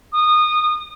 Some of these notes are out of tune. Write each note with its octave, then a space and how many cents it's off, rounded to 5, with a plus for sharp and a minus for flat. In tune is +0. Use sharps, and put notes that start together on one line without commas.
D#6 -20